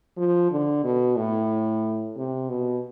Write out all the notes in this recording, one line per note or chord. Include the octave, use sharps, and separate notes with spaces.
F3
D3
B2
A2
C3
B2